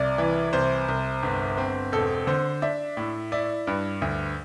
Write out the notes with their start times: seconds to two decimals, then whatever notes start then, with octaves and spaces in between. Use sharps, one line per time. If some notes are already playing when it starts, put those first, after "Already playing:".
Already playing: C2 D5
0.18 E3
0.53 C2 C5
0.88 C2
1.23 G1
1.58 C4
1.92 E1 A4
2.27 D3 C5
2.62 D4 E5
2.97 A2
3.32 E4 D5
3.67 G2
4.02 D2